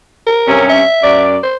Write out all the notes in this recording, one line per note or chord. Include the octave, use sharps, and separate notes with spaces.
A#4
G2 C3 C#4
E5
F#2 D5
C5